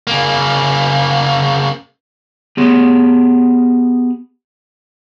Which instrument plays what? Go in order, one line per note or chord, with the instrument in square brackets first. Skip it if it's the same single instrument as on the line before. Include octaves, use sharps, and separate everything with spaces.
[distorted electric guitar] C#3 A#3
[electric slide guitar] B3 G4 G#4